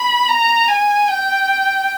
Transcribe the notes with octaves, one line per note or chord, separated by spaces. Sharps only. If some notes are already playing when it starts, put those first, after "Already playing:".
Already playing: B5
A#5
G#5
G5